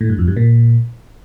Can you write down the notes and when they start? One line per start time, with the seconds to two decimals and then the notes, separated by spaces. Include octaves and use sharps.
0.01 A2
0.10 G2
0.19 F2
0.28 G2
0.37 A#2